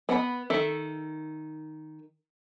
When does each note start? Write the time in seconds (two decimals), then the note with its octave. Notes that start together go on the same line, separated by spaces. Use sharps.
0.09 B3 F#5 G5 B5
0.50 D#3 A4 E5